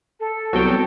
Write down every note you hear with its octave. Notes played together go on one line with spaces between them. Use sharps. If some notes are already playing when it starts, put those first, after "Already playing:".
A4
C2 F#3 B3 F#4 G5